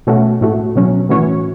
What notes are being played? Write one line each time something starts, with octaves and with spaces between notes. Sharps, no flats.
B2 A3 C#4 F#4
A2 A3 F#4
B2 F#3 C#4
A2 E3 C#4 F#4 C#5